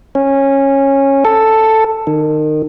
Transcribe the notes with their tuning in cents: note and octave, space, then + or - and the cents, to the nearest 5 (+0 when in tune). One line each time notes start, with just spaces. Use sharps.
C#4 -15
A4 +5
D#3 -25